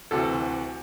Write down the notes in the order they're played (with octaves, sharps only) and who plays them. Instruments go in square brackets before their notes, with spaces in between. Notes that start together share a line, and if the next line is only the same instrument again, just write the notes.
[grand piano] D2 C3 E3 F#4 A4